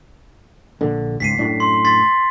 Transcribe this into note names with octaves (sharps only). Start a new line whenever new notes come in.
A#1 D3
C#2 G#2 B6 C7 D#7
F#2 A2 D4
C6
C6 A6 B6